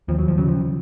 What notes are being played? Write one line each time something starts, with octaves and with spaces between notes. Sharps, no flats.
D#2 F3
F#3
F3
C#3 F#3
F3